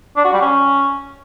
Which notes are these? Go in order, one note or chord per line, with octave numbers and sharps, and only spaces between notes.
D4
F#4
G3
C#4